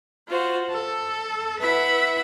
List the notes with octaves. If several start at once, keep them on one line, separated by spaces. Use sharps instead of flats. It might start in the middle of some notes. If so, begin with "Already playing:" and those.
F4 F#4 C5
A4
E4 B4 E5 F#5 B5